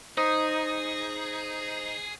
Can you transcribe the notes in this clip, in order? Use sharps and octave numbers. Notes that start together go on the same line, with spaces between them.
D#4 G#4 C5 D#6